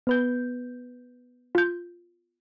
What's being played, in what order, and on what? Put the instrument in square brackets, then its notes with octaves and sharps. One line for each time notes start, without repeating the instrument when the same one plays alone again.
[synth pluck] B3 B4 G6
[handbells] F4 G6